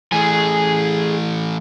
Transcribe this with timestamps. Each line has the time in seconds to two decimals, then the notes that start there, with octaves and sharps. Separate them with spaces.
0.12 E3 A3 G#4 G#5